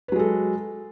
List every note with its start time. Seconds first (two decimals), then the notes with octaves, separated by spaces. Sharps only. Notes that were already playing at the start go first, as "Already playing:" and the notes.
0.08 B4
0.12 F#3
0.16 G#3
0.19 A4